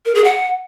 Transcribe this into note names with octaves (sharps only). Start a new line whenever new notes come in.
A#4
G#4
F#5